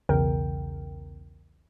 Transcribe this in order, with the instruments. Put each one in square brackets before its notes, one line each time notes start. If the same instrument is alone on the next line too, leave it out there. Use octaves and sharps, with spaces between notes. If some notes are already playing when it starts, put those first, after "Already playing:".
[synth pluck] B1 E2 C#3 A#4 G5